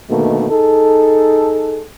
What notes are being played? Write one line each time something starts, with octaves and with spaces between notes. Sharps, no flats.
B2 D3 D#3 A3 A#3
D#4 G#4 A4